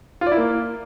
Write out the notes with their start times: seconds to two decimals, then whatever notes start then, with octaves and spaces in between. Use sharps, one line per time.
0.21 F4
0.27 D5
0.32 E4
0.37 A#3